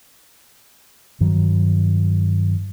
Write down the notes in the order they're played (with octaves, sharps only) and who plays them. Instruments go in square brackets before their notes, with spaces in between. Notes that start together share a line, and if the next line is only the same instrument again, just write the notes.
[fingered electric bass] G2 D#3 F#3